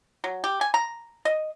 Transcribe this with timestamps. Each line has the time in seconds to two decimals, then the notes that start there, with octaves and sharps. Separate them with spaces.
0.24 F#3
0.44 G4
0.61 G#5
0.74 A#5
1.25 D#5